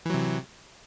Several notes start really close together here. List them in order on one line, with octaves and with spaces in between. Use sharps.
E3 F#3 C3